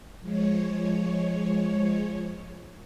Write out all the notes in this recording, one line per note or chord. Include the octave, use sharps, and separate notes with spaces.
F3 G#3 C#5